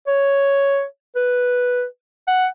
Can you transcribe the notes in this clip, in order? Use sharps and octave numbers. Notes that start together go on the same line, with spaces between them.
C#5
B4
F#5